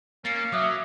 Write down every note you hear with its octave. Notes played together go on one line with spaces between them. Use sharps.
A#3 C#4 A6 C7 C#7
F#3 E5 D6 D#6 F#6